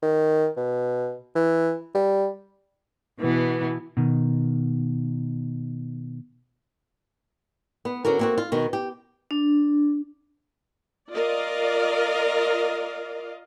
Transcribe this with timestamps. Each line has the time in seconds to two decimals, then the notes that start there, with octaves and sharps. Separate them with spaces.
0.02 D#3
0.57 B2
1.35 E3
1.94 G3
3.20 B2 E3 B3
3.97 B2 D#3
7.85 B3
8.05 D3 C#4 F#4 A#4
8.19 A#3 C4 F#4
8.38 F4
8.52 B2 D#3
8.73 G4
9.31 D4
11.12 F4 A#4 D5 D#5 F5